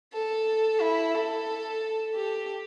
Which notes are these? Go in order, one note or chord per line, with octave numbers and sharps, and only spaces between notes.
A4
E4
A4
G4